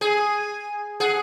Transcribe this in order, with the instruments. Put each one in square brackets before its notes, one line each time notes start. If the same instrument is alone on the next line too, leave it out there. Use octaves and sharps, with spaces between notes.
[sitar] G#4 [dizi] G#5
[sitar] G#4 [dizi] F#5